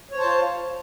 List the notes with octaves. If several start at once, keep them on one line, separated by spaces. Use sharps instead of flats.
F4 C5 C#5 A5